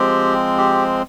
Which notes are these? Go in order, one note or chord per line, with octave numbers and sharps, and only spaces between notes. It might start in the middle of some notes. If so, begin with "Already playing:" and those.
Already playing: F3 G#3 C4 G4
G4